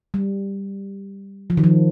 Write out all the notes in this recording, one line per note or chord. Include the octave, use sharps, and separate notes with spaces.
G3
F3
D#3
F3